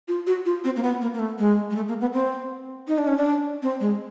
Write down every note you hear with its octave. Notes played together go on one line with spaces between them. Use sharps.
F4
F#4
F4
C4
A#3
B3
A#3
A#3
A3
G#3
G#3
A3
A#3
B3
C4
D#4
D4
C#4
D4
C4
G#3